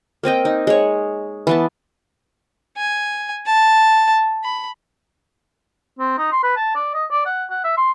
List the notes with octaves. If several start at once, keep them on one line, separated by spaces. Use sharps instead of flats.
A#3 C4 D#5 G5
D#4
G#3 C#5
E3 B3 A5
G#5
A5
B5
C4
D#4
C6
B4
A5
D5
D#5
D5
F#5
F#5
E5
C6